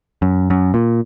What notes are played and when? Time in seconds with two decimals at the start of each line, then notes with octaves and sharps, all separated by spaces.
0.22 F#2
0.50 F#2
0.74 A#2